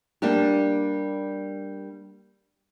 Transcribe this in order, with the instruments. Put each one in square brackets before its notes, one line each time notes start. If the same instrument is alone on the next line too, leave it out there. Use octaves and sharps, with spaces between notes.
[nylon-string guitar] G3 A#3 D4 G4